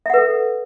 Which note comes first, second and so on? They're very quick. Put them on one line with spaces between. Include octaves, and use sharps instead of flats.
E5 F#5 B4 A4